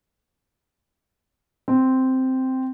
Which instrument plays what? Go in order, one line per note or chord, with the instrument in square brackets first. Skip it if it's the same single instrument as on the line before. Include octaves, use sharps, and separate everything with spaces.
[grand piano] C4